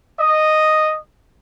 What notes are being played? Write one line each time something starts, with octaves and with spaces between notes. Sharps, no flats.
D#5